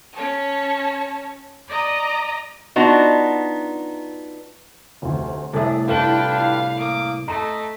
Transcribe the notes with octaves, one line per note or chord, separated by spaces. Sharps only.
C#4 C#5 A5
D5 D#5 A#5 D#6
B3 D4 D#4 F4 F#4
F1 D2
C2 A2 D4 G#4 A4 D5 E5
D4 E4 F4 G4 A4 B4 G5 F#7
F5
A#3 D6 D#6
A3 D#5 A#5